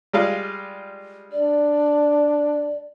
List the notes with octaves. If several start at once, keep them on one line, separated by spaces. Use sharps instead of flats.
G3 G#3 F4
D4 D5